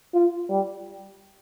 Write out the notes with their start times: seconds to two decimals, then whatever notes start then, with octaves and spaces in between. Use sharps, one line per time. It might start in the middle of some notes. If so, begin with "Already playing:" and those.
0.14 F4
0.49 G3